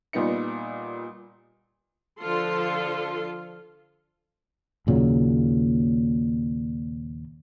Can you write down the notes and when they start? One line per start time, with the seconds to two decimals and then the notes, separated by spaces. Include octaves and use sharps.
0.13 A#2 G3 B3 D#4 D#5 C#7
2.19 D3 F3 F4 A4 C6
4.87 D#2 A#2 C#3 F#3